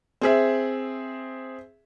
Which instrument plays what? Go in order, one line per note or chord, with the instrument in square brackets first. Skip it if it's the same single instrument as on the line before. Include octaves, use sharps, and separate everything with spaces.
[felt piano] C4 G#4 E5